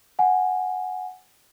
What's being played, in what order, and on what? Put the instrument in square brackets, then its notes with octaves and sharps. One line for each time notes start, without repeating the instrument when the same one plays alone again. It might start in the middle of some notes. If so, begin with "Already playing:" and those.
[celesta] F#5 G#5